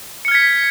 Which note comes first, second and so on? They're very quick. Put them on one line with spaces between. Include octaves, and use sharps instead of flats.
C#7 F6 G#6 B6